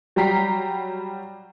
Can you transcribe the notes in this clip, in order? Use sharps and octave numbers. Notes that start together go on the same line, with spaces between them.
F#3 G3 G5 A#5 B6 C7